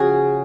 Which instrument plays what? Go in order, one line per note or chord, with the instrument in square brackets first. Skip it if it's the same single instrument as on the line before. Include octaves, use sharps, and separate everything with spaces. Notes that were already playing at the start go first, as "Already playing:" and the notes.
Already playing: [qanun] C#3 F3 C#4 F#4 G#4